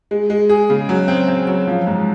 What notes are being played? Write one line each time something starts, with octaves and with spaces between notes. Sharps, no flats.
G#3
G#3
G#4
C#3
F#3
C4
C4
F#3
F3
G#2